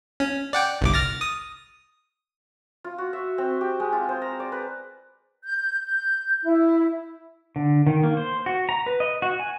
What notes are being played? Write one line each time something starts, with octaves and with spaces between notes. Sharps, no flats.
C#4
D5 F#5 G5
G1 C2 D6
F6 A6 A#6
D#6
F4
F#4
E5
C4
G4
G#3
F4
C5
A#5
D5
B4
G6
G6
E4
D3
D#3
A#3
C5
F#4
A#5
B4
D#5
F#4
G#5